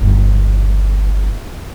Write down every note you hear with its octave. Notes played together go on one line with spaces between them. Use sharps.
G1 C#2